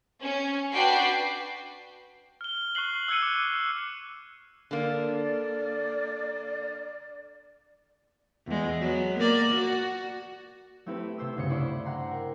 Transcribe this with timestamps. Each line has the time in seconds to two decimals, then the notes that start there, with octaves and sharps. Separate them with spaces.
0.22 C#4
0.72 D4 F#4 B4 G5 C7
2.41 F6 G7
2.75 C#6 F#6 C7 F#7
3.08 E6 F#6 G#6 C#7 D#7
3.22 D6
4.71 D3 A#3 D5
8.47 E2 G#3
8.81 F#3 B3
9.18 A#3 A#4 D5
9.51 F#4
10.86 A3 C4 E4 G4 B4
11.18 C3 C5 E6
11.36 D2 G2 C#3 C5 C#7
11.49 D4 E4 C5 D5 B5 C#6
11.85 F#5 G5 A#5 C6
12.11 A#4